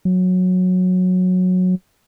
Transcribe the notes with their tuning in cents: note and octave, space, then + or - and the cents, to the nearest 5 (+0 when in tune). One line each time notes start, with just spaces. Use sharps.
F#3 -15